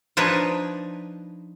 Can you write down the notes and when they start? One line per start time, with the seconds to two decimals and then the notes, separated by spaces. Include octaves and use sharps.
0.17 F3 D4 D#4 B4 C#5